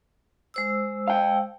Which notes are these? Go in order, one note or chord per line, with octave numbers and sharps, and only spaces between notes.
G#3 C5 E6
F5 G5